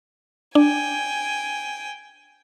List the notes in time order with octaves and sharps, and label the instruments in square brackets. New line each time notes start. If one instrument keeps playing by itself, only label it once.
[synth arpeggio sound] D4 [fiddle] G5 G#5